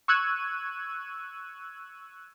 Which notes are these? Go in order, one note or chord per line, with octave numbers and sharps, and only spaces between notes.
C#6 E6 F#6 G#6 D#7